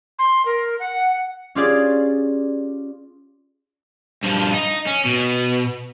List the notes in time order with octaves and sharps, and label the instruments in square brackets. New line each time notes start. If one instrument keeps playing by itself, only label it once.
[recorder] C6
A#4
F#5
[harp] C#4 F4 G4 G#4 D5 G#6
[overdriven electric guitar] G2 F3
D#4
C#4
B2